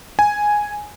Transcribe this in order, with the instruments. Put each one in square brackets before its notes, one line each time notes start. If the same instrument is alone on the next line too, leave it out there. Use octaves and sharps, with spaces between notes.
[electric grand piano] G#5